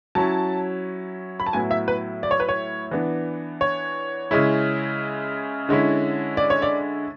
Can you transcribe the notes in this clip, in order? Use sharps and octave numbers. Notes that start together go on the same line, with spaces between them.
F#3 C#4 E4 A5
B5
A5
A2 F#3 B3 E4 G#5
E5
B4
D5
C#5
B4
C#5
E3 B3 D4
C#5
C#3 G#3 C#4 E4
D3 G#3 C#4 E4
D5
C#5
D5